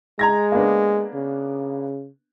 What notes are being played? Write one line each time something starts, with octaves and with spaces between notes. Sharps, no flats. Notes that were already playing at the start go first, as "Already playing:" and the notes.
G#3 A#5 G#6 A#6
A#3 B3 D4
C#3